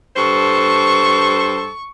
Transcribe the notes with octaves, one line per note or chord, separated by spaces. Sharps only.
G2 A4 C5 C#6